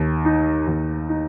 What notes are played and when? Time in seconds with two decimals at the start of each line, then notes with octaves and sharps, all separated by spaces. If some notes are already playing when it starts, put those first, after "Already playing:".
Already playing: D#2
0.25 D#4
0.67 D#2
1.09 D#4